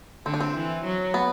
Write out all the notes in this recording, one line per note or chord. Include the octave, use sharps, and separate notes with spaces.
D3 C4
D4
C4
E3
F#3
B3